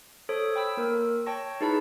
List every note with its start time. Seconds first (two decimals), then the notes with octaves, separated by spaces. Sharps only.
0.29 A4 C5 C#5 D#6
0.56 G5 B5 E6
0.77 A#3 A#4
1.26 C#5 G5 A5 C#6 A#6
1.61 D#4 E4 G#4 B4 A5 B5